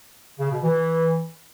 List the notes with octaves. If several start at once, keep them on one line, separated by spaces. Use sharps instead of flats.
C#3
B2
E3